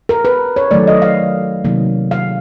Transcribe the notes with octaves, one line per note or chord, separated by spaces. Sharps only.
A#4
B4
C#5
D#3 F#3 A3 D5
D#5
F5
C3 D#3 F#3 A#3
F5